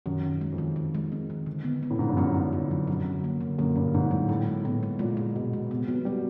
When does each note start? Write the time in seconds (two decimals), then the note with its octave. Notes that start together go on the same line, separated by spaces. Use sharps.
0.06 F#2 D#3
0.24 D#3
0.29 F#2
0.41 G#3
0.52 F2
0.58 D#3
0.76 D#3
0.95 G#3
1.12 C4
1.30 D#3
1.46 D3
1.64 B3
1.83 B3
1.90 A2
1.99 G#2 D3
2.09 G2
2.17 F#2 B3
2.35 D3
2.41 F#2
2.53 D3
2.64 F2
2.71 F#3
2.88 F#2 F#3
3.05 D3
3.24 A#3
3.41 D3
3.58 F#2 A#3
3.76 G2 D3
3.94 G#2 D3
4.11 A2 F#3
4.29 A2 G#3
4.47 G#3
4.64 A2 B3
4.83 G#3
4.99 A#2 G#3
5.17 G#3
5.35 B2 B3
5.53 G#3
5.70 C3 B3
5.88 F#3 B3
6.05 G3 F#4